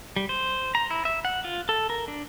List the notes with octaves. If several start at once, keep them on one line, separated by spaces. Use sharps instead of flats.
G3
C5
A#5
E4
E5
F#5
F4
A4
A#4
D4